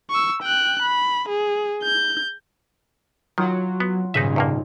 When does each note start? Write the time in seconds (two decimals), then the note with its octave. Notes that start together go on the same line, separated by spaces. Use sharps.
0.10 C#6 E6
0.42 G5 F#6
0.82 B5
1.29 G#4
1.83 G6
3.38 D#3 F#3 F4 F#5
3.80 B3
4.14 D#1 G#2 C#3 C#4 D#4 B4 E5
4.36 E2 G2 A#3